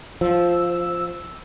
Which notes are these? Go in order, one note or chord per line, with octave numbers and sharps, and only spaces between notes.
F3 E6